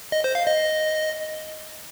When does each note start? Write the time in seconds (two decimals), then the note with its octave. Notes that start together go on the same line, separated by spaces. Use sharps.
0.12 D#5
0.24 C5
0.35 F5
0.47 D#5